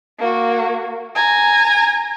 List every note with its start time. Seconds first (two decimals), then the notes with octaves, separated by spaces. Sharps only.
0.19 A#3 F#4
1.15 G#5 A#5